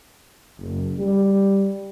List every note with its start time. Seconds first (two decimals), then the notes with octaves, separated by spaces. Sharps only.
0.59 F#1
0.98 G3